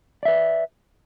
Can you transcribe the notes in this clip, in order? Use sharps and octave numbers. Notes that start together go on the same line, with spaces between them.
B4 D5 E5